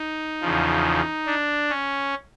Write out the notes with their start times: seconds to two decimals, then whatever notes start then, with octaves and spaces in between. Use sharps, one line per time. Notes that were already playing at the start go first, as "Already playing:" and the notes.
Already playing: D#4
0.41 E2 C#3 F3
1.26 D4
1.70 C#4